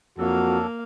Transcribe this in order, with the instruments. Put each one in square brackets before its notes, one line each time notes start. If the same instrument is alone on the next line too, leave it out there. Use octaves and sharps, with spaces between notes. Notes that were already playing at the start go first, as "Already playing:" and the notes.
[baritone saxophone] F2 [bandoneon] F#3 D4 A4 [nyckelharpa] A#3 F5 [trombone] F#4